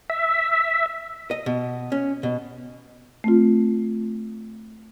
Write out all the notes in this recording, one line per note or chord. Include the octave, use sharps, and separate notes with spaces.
E5
D#5
B2
C#4
B2
A3 C4 F4